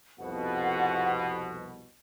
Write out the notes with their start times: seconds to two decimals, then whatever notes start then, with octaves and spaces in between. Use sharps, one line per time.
0.20 C2 F2 B2 F#5